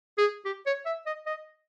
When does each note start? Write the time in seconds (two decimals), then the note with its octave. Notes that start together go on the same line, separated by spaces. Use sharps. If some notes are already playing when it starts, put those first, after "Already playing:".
0.18 G#4
0.45 G4
0.66 C#5
0.86 E5
1.06 D#5
1.26 D#5